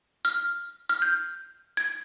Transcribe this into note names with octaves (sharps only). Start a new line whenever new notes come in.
F6
F6
G6
G#6